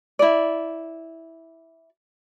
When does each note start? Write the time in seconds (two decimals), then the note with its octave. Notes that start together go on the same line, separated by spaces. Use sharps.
0.19 E4 D5